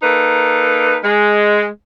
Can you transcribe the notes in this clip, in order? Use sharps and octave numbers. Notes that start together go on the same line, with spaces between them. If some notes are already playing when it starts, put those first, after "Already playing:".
A#3 D#4 A4 B4
G#3